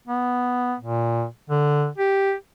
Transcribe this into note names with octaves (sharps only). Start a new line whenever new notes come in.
B3
A#2
D3
G4